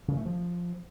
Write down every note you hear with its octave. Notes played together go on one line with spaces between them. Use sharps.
C#3
A3
F3